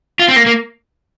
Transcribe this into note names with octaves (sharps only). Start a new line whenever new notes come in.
F4
C4
A#3
A#3